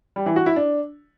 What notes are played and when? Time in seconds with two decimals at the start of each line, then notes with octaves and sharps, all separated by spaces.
0.16 G3
0.26 E3
0.36 F#4
0.46 E4
0.56 D4